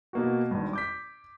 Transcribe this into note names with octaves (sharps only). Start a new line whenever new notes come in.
B2 A#3 F#4
G#1 G2
D6 G6 B6